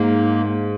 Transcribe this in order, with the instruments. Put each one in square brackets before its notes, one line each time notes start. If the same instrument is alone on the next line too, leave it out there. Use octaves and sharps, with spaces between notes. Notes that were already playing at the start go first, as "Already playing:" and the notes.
Already playing: [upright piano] G#2 [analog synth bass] A#3